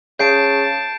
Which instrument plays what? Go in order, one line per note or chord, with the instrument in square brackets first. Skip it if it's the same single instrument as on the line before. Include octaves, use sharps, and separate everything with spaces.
[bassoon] C#3 [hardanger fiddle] A5 [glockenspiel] G6 C7 D7